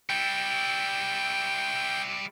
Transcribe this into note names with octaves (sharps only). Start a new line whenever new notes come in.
G3 E4 G5